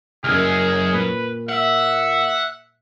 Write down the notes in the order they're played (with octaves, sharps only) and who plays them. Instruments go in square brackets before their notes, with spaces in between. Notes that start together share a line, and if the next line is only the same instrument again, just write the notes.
[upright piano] F#1 F6 [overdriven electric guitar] C#2 F#2 [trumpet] G#4
[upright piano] A#2 [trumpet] B4
[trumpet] E5 [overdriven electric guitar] F#5